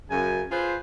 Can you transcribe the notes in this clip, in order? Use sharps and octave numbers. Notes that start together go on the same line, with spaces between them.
F#2 C#3 G#5
F4 G#4 B4 C5